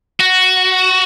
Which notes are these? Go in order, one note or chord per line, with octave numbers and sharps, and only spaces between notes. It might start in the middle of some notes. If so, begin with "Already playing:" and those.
F#4